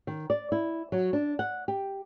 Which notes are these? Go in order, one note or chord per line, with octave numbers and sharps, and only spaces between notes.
D#3
D5
E4
F#3
D4
F#5
G4